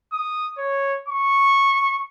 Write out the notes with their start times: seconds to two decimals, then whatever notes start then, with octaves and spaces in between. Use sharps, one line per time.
0.12 D#6
0.58 C#5
1.08 C#6